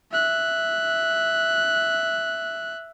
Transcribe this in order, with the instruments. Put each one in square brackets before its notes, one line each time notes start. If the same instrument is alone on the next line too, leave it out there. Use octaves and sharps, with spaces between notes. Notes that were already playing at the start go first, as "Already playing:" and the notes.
[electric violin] E5 F#6